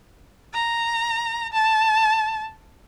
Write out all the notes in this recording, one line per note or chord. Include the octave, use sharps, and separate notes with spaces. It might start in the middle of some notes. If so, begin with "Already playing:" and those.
A#5
A5